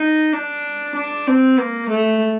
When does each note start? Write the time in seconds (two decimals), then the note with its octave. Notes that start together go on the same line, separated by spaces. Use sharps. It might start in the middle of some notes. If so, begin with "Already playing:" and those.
Already playing: D#4
0.33 D4
0.95 D4
1.27 C4
1.59 A#3
1.89 A3